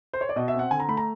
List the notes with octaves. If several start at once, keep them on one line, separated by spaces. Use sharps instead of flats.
C5
C#5
D5
B2 D#5
E5
C4
F#5
D3 G#5
A#5
A3 B5
A#5